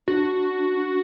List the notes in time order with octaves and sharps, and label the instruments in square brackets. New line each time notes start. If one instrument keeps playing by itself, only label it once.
[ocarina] D4 [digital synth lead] F#4